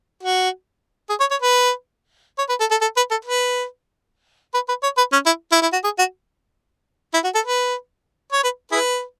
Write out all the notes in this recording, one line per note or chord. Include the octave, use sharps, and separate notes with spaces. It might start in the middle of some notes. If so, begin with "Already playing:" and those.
F#4
G#4
C#5
C#5
B4
C#5
B4
A4
A4
A4
B4
A4
B4
B4
B4
C#5
B4
C#4
E4
E4
E4
F#4
G#4
F#4
E4
F#4
A4
B4
C#5
B4
E4 G#4 B4